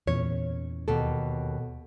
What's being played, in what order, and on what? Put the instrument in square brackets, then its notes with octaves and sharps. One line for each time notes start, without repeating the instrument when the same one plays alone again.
[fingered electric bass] E2 A#2 E3 [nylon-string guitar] C#4 C#5
[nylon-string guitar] D#2 B2 A4